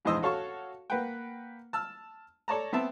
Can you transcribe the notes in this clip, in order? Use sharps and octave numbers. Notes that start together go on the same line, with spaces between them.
A#1 E2 G#2 C5 D#5 E6
F#4 A4 C#5 F5 A5 C#6
A#3 B4 F#5 G5
A5 E6 F6
A4 C#5 D5 A5 A#5
B3 C4 E5 A5